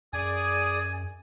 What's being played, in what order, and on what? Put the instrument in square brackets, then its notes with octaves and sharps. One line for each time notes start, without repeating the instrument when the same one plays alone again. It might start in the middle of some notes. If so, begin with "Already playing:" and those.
[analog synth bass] F#2 [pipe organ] G#4 D5 D#6 [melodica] G#5